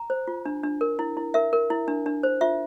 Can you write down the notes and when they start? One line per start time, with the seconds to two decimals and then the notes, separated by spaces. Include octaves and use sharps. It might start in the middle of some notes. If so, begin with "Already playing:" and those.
Already playing: A#5
0.10 C5
0.28 F4
0.45 D4
0.63 D4
0.81 A#4
0.99 E4
1.17 E4
1.34 A#4 E5
1.53 A#4
1.70 E4
1.88 D4
2.06 D4
2.23 C5
2.41 F4 E5